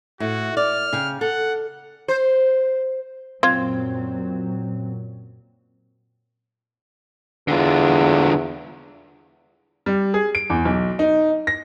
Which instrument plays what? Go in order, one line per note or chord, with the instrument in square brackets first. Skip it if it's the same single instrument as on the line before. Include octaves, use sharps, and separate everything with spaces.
[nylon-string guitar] A2 [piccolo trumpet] F#4
[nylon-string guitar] D5 [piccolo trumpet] F6
[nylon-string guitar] C#3 G5
[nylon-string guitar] A4 [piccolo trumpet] F#5
[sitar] C5
[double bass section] F#2 A#2 F#3 [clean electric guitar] C4 [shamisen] F4 C5 [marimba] G#6
[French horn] E2 [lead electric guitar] D3 F4
[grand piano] G3
G#4
D7
E2
B1
D#4
A#6